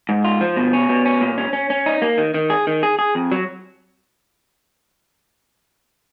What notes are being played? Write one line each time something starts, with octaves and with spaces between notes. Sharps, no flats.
G#2
F4
F3
B2
C#4
B2
C#4
A#2
C#4
C#4
C#4
D#4
A#3
D#3
D#3
G#4
D#3
G#4
G#4
F2
F#3